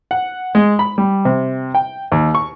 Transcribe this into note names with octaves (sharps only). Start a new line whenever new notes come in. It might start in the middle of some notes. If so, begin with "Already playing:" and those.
F#5
G#3
B5
G3
C3
G5
D#2
C#6